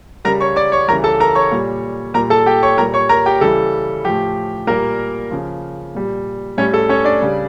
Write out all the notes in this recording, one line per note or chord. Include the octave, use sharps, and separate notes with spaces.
C#3 G3 A#4 A#5
C#5 C#6
D5 D6
C#5 C#6
C#3 E3 G3 A#4 A#5
A4 A5
A#4 A#5
C#5 C#6
A#2 G3
A#2 G3 A#4 A#5
A4 A5
G4 G5
C#5 C#6
A#2 G3 A#4 A#5
C#5 C#6
A#4 A#5
G4 G5
C#3 E3 G3 A4
A2 F3 G4
A#2 G3 A#3 A#4
C#3 F3
A#2 G3
A2 G3 C#4 C#5
A4
C#4 C#5
D4 D5
C#3 G3